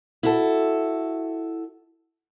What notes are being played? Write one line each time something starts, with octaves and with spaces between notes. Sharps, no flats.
E4 F#4 A4